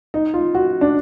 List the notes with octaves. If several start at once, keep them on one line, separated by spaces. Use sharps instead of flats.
D#4
F4
F#4
D4